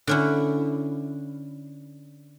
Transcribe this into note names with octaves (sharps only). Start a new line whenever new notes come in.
D3 C#4 E4